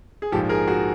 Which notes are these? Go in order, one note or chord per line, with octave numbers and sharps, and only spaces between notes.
G#4
A#1 G#2 F3 G4 A4
G#4 A#4
F#4 G#4